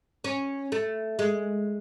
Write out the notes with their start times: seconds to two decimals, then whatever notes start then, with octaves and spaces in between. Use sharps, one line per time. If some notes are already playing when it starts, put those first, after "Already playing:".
0.24 C#4
0.72 A3
1.19 G#3